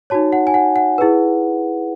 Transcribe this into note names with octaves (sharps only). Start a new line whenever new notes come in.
D#4 F#4 C#5 A5
F#5
G#5
F#5
F#5
E4 G#4 B4